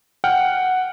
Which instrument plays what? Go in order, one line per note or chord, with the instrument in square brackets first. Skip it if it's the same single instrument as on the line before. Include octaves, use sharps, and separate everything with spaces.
[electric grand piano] F#5 G5 F6